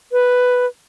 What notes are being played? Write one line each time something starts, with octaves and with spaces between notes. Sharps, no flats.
B4